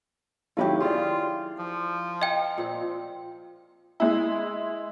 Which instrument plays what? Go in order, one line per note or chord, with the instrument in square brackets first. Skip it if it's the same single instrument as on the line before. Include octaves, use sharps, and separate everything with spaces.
[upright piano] D#3 F#3 F4 [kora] A3 E4 G4
[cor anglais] F4 [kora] G#4 [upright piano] D5 C6
[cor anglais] F3
[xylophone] D#5 G5 [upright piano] F5
[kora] A#2 C4
[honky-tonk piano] G#3 E4